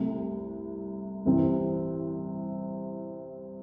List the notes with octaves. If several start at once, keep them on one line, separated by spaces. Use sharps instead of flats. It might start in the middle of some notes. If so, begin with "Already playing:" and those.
Already playing: C2 C3 A3
C2 C3 E3 C4